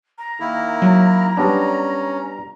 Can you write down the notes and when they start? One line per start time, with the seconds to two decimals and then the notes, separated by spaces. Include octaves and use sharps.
0.18 A#5
0.40 D#3 A#3 E4
0.82 F#3
1.37 G3 B3 C#4 D4